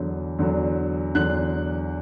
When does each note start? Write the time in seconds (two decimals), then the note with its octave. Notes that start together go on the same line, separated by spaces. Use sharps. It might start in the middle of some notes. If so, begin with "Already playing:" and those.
Already playing: E2 D3 F#3
0.39 E2 D3 F#3
1.15 E2 D3 F#3 F#6